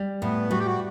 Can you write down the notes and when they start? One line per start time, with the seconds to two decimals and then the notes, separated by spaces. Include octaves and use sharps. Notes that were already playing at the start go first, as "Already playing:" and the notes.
Already playing: G3
0.22 A2 B3
0.51 G3 F#4
0.59 G4
0.67 F#4